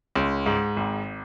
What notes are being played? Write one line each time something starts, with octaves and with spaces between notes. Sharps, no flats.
C#2
G#2
G#1